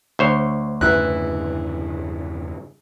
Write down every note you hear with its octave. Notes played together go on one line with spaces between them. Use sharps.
D2 C5 C#5
E2 G2 C#3 E3 E4 F#6